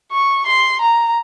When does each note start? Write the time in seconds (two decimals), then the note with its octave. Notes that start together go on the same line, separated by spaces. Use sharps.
0.12 C#6
0.47 C6
0.82 A#5